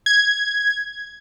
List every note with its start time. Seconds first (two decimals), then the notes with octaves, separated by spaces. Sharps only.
0.06 G#6